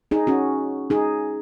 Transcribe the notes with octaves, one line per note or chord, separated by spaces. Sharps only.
D#4 G#4
C#4 F#4
D#4 G#4